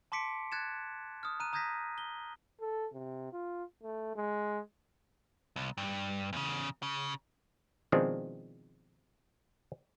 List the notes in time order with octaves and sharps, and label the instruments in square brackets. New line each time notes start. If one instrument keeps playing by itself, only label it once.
[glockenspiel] A5 C6 D6 B6 C#7 D7
F#6 G#6 A6 C#7 E7
D#6 F6
A#5 F#6 D#7
A#5 D#6 G6 G#6 A#6 B6
G7
[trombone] A4
C3
F4
A3
G#3
[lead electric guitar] C2
G2
E2 C#3
C#3
[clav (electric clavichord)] B2 D#3 F3 G#3 C4 D4